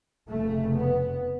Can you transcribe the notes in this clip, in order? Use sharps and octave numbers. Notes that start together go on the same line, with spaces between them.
F1 F2 C#3 A3
B3